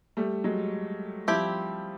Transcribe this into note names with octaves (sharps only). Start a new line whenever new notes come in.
G3 A3
F#3 G#3
F3 G3 C4 E4 G4